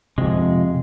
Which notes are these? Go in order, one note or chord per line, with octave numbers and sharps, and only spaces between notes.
F2 C3 G#3